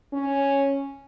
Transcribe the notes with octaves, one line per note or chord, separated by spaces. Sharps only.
C#4